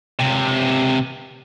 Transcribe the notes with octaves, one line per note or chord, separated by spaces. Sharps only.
C#2 C3